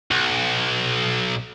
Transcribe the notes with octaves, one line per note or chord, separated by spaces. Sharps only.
B1